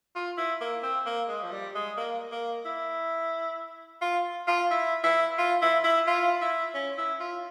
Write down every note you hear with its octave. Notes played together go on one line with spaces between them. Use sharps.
F4
E4
A#3
C4
A#3
G#3
F3
G3
G#3
A#3
A#3
E4
F4
F4
E4
E4
F4
E4
E4
F4
E4
C#4
E4
F4